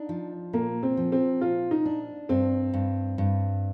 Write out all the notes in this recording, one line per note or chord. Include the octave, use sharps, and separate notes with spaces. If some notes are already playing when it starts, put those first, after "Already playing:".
Already playing: D4 D#4
F3
A#2 A#3
C4
F3
C4
A#2 F4
D#4
D4
G2 C4
G2
G2